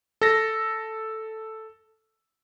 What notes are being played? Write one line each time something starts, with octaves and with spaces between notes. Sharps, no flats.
A4 A#6